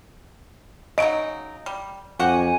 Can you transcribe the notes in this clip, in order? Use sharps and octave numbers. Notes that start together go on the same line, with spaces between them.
C#3 F#3 D#4 D#5 D7
G3
F2 F#4 G4 F#5 G#5